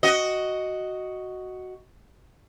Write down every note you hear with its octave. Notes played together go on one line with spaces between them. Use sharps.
F#4 D#5